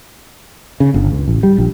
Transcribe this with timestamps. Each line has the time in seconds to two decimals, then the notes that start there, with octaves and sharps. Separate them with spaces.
0.80 C#3
0.94 G1
1.12 C#2
1.28 A1
1.43 G3
1.58 A#1